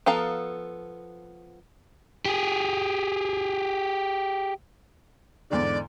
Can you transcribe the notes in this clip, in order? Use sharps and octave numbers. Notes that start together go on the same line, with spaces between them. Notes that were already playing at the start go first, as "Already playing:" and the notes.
F3 B3 A4 F5 A#5
G4 G#4
E2 G#2 D3 D5